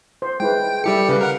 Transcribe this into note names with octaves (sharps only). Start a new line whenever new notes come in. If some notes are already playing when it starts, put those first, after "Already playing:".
C5
G#3 E4 B4 G5
G3 E4 G4 A4 C#7
C#3 B4 F5
A#4 F#5 F6